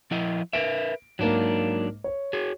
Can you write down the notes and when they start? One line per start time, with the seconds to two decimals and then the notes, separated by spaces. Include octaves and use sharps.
0.11 F3 E4 D#5
0.53 A#4 B4 E5 D7
1.19 G#2 F#3 A#3 D4
2.04 C#5
2.33 F#4 G#4